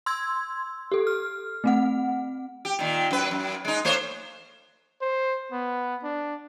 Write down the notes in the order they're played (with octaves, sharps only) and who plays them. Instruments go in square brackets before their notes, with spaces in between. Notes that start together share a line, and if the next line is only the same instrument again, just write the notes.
[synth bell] C6 E6 G#6
G4 A4
F6
A3 C4 F#5
[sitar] G4
A#2 D#3
F#2 B4
F#2
G#3 D#4
A3 C5 C#5
[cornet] C5
B3
D4